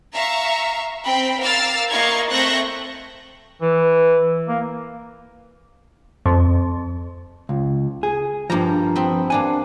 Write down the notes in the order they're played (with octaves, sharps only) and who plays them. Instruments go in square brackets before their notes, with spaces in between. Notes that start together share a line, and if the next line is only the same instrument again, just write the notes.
[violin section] E5 F5 A#5 C#6
C4 G5 B5
A#4 F5 D6 E6 F6 A6
A#3 E4 D#5 F5 C#6 G#6
A3 C4 C#6 F#6 G6 A#6
[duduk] E3
A#3
[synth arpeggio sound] F2
[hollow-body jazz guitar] C#2
G#4
[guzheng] G2 A#3 A#5 [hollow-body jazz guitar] F3
[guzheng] B3 C4
[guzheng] A#3 D4 F#5 [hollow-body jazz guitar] G#5